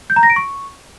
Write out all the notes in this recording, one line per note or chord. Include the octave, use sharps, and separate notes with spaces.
G6
A#5
A#6
D7
C#6